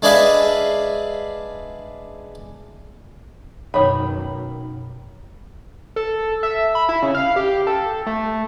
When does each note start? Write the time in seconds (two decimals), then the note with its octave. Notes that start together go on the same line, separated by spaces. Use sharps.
0.02 G#3 D4 G#4 B4 E5 F5
3.74 F#2 B2 D#3 C#5 B5
5.96 A4
6.43 E5
6.75 B5
6.89 E4
7.02 C#3
7.15 F5
7.36 G4
7.67 A4
8.07 A3